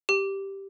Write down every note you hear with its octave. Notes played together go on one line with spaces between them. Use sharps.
G4